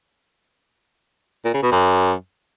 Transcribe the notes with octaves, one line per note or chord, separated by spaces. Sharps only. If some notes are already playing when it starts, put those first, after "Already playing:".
A#2
C#3
B2
F#2